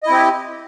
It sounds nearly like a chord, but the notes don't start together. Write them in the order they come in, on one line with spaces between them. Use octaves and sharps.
D#5 E4 C4 G4